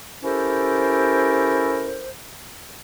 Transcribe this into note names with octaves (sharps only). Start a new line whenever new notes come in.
C#4 E4 G4 A4 A#4 C5